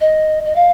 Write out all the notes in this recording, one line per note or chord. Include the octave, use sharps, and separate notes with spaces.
D#5
D#5
F5